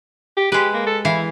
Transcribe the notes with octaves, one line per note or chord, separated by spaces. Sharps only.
G4
G#3 G4 B4
A#3
A4
E3 E4 F5